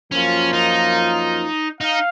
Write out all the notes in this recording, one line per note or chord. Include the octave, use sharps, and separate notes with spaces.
F#2 F3 A#3 C#4 F4
D#4
D#4 F5